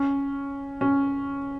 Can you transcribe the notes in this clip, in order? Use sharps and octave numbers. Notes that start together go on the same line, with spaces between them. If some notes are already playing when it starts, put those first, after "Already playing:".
Already playing: C#4
C#4